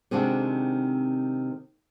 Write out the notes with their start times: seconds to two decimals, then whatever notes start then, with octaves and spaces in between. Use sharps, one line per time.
0.11 C3 D#3 G#3 C4 D4 F#4